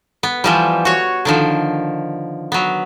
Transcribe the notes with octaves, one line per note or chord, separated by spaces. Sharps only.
B3
E3 F3 G3
F#4 C#5
D3 D#3 F3
F#3 B3